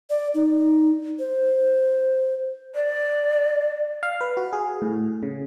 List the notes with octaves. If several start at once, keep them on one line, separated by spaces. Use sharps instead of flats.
D5
D#4
C5
D5
F5
B4
F#4
G#4
A2
C#3